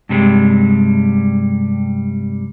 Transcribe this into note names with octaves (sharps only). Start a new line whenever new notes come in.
G2 C3 G3 G#3